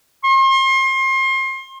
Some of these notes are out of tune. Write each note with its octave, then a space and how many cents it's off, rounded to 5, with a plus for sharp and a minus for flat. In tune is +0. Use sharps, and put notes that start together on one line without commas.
C6 +35